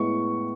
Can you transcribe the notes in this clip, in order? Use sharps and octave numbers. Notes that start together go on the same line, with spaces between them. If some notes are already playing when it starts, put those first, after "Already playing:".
Already playing: A2 G#3 B3 C#6